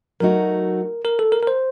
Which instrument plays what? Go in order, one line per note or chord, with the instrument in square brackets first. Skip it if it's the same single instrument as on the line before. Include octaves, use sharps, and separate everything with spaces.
[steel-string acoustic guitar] F#3 A3 D#4 F#4 [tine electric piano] A#4
[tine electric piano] A#4
A4
A#4
A#4
C5